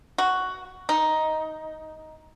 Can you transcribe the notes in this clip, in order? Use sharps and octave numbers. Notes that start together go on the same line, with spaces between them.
F#4
D#4